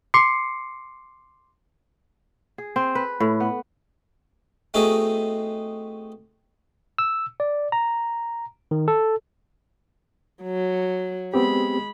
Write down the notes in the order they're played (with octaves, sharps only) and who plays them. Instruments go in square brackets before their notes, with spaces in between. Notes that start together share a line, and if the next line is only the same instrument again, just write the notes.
[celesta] C6 D6 C7 C#7
[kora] G#4
C4
B4
A2
B3
[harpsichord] A3 B3 C4 D#4 F#4 G#4
[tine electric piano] E6
D5
A#5
D#3
A4
[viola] F#3
[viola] G#3 B5 [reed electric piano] B3 C4 G4